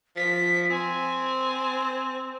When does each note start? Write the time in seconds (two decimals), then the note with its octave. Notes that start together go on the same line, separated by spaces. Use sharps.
0.16 F3 B6
0.70 C4 G#5